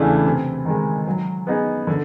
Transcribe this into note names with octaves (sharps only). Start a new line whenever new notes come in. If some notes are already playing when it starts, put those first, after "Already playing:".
Already playing: E2 C#3 E3 A3 D4
C3
D#3 G#3
F#3
B3 D#4 G#4
D3